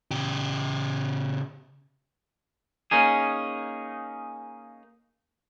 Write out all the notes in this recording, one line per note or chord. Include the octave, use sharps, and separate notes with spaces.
C#3 G4
A#3 C#4 D#4 G#4